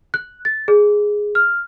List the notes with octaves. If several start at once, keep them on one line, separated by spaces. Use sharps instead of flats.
F#6
A6
G#4
F6